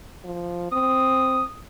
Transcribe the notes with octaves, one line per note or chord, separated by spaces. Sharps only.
F3
C4 D#6